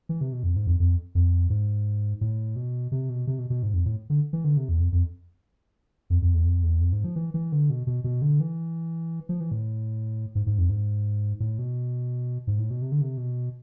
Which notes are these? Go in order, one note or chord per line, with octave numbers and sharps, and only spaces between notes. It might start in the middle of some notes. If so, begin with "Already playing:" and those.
E3
C3
B2
F2
G#2
F2
F2
F2
G#2
A2
B2
C3
B2
C3
B2
B2
G#2
F2
A2
D3
E3
D3
C3
E2
F2
F2
F2
F2
E2
F2
E2
F2
G#2
F3
E3
E3
D3
B2
B2
B2
D3
E3
F3
E3
A2
G#2
G#2
F2
G#2
A2
B2
G#2
A2
B2
C3
D3
C3
B2